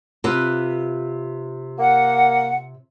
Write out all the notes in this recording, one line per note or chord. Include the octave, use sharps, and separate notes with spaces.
C3 F4 B4
A#3 F#5